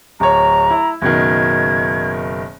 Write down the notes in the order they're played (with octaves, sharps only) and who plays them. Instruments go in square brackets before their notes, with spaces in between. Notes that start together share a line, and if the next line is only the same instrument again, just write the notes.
[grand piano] D1 C#5 [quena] A#5
[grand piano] E4
[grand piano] F#1 B2 D#3 [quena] G#6